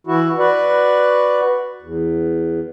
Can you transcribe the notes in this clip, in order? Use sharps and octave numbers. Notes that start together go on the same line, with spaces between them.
E3 E4 F#4
F#4 B4 D5
E2